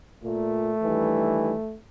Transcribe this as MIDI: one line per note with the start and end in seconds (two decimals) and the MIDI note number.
0.24 0.71 46
0.24 1.77 57
0.83 1.52 43
0.83 1.52 51
0.83 1.52 52